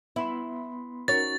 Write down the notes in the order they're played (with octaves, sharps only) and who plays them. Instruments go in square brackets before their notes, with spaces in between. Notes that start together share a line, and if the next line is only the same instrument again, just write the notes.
[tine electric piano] B3 B5 C6 [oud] E4
[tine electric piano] C#4 D#4 F#4 [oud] A#4 C#5 [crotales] A6